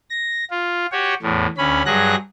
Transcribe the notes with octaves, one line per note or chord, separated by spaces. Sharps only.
A#6
F4
F#4 G4 C#5
E2 A2
D2 C#4 B5
G2 F#3 G#4 F#6 A#6